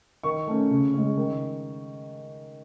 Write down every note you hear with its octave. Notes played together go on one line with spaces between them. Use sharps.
D#3 C#6
A3 C#4
C#3
G#3 C#4
D#3